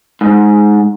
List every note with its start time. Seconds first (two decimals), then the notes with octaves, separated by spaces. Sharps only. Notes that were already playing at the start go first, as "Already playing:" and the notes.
0.21 G#2